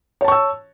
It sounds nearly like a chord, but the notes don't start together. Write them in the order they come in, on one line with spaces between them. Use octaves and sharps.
C#5 A5 C#6 E6